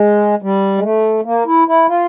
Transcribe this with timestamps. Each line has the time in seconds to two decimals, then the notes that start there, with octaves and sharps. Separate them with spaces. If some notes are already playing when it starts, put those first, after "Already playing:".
Already playing: G#3
0.42 G3
0.78 G#3
0.83 A3
1.25 A#3
1.46 E4
1.68 E4
1.88 F4